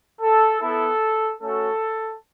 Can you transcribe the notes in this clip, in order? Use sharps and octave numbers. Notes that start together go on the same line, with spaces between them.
A4
B3 E4 A4
A3 C#4 F#4 A4